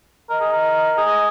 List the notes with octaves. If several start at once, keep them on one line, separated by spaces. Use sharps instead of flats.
A#4 D#5
G#4
A#4
G#4